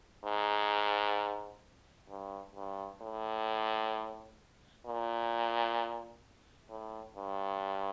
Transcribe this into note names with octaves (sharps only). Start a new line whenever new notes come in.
G#2
G2
G2
A2
A#2
A2
G2